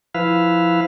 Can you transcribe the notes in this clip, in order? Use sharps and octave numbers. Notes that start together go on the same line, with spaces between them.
F3 E4 B4 F5